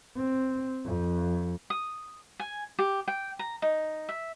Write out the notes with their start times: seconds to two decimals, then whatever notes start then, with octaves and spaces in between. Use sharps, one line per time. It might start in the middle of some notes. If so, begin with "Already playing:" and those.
0.17 C4
0.85 F2
1.70 D#6
2.40 G#5
2.79 G4
3.08 G5
3.39 A#5
3.62 D#4
4.09 E5